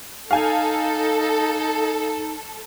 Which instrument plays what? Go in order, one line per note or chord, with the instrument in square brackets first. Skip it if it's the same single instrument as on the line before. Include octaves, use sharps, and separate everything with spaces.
[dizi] D#4 [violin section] A4 [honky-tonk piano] F5 G#5 G6